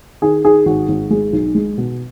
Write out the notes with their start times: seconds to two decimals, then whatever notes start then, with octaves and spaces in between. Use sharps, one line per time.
0.22 D#3 G#4
0.44 D#3 G#4
0.66 G#1 F#4
0.89 G#1
1.10 G#3 G#4
1.33 B1
1.55 G#3
1.78 B2